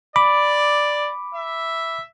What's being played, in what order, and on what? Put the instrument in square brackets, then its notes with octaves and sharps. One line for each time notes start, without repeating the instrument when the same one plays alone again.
[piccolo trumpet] D5 [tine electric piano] B5 D6
[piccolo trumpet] E5